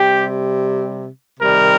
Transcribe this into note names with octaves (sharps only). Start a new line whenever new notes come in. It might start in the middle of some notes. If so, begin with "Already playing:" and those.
Already playing: C3 G3 G4
C3 D#3 G3 A#4